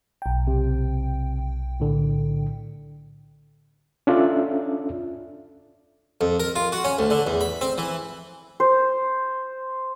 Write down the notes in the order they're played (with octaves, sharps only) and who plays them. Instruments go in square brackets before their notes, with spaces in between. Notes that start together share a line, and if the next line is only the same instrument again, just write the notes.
[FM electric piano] B1 G5
[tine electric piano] C3
A2 D3
[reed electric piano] C#4 D4 F4 A4 D5 E5
[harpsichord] F2
A#4
F4
F#4
C#4
D2
D3
E2
B5
C4
E3
[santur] C5